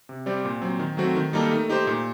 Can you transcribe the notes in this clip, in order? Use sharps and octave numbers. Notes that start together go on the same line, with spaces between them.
C3
G3 C4 G4 D5
A#2
F#3 C4
D#3
F#3 A3 C4 F#4
D#3
G3 A#3 D#4 A4
A3
D#4 G4 C5
A#2